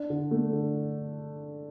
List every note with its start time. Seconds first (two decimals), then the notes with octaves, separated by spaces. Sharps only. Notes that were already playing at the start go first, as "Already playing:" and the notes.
Already playing: D4
0.10 D3
0.31 A3
0.53 D3